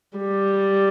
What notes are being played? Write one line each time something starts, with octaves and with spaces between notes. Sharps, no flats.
G3